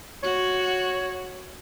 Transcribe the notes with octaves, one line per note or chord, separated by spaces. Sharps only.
F#4 C#5